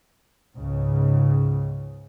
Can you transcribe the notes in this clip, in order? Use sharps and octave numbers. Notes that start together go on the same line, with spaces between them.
C#2 G#2 C#3